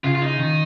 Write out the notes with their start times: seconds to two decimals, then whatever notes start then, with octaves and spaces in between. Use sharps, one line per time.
0.04 C#3 F4
0.15 F4
0.22 D#4
0.39 D#3